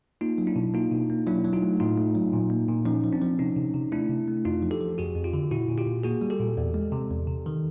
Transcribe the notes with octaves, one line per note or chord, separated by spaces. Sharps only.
A#3 D#4 F4
F#3
D4 E4
B2
A#3 D#4 F4
B2
A#3
F#3 D4 E4
F#3
D#4 F4
A3
A2 D#4 F4
A3
F#3
A#2
A#3
A#2
F3 C#4 D#4
F3
C4 D4
F3
C3 C#4 D#4
C3
C3
A3 D4 E4
C3
A3
F2 D#4 F4
F3
G4 A4
F3
F2 F#4 G#4
F2
F4 G4
D3
A#2 E4 F#4
A#2
F4 G4
A#2
A#3 F#4 G#4
G3
G4 A4
A#2
E2
G#3
C3
E2
C3
D#3